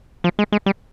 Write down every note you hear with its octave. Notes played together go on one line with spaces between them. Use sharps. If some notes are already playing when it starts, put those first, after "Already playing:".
F3
G#3
G#3
G3